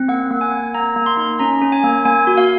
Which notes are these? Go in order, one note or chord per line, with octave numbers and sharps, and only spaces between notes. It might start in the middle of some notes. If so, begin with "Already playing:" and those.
Already playing: C4
A#3 F#5
A#3
G#5
A#3
A#3 A#5
A#3
C6
D#4
C#4 A#5
C#4
G#5
A#3
A#3 G#5
F#4
F5